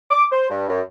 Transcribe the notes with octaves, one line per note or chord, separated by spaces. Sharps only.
D6
C5
G2
F#2